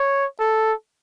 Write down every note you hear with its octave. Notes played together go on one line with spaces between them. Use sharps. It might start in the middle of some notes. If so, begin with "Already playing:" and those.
Already playing: C#5
A4